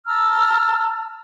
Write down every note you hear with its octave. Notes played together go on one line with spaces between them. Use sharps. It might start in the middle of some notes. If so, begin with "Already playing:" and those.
A5 A#5 E6 F6